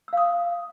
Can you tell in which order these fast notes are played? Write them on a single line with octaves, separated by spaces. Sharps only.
E6 F5 D#6